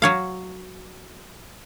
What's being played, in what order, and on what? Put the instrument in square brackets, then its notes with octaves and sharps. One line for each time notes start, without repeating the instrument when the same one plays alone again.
[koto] F#3 C#5 F5